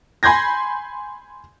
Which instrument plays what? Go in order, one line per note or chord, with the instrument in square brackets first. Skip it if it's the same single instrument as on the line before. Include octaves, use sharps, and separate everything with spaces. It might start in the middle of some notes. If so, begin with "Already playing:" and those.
[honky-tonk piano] G#5 B5 C6 G6 G#6 A#6